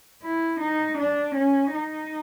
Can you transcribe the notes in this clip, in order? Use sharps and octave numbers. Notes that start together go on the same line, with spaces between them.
E4
D#4
D4
C#4
D#4